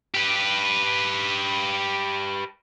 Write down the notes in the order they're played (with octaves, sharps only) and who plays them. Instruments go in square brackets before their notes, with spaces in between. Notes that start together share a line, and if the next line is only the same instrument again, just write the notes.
[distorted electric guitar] G4 B4